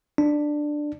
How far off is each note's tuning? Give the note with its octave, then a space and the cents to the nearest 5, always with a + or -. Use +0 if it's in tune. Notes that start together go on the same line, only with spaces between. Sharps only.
D4 +10